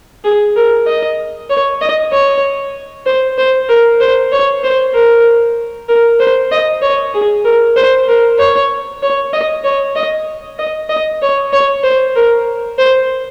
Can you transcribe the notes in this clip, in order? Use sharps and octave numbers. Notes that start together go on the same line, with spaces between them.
G#4
A#4
D#5
C#5
D#5
C#5
C5
C5
A#4
C5
C#5
C5
A#4
A#4
C5
D#5
C#5
G#4
A#4
C5
A#4
C#5
C#5
D#5
C#5
D#5
D#5
D#5
C#5
C#5
C5
A#4
C5